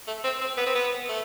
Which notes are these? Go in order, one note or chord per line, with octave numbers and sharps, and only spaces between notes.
A3
C4
C4
B3
C4
B3
A3